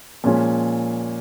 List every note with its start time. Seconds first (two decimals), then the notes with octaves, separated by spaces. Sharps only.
0.24 A#2 F3 G#3 C#4 F4